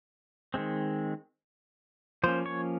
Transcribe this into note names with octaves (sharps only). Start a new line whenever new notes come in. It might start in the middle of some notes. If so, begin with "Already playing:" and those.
D#3 G#3 C4
F3 A#3 C#4 C5
C#5